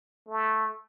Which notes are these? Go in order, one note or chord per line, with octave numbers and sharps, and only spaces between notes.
A3